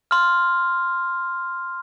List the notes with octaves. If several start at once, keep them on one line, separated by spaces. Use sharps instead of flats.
C6 F6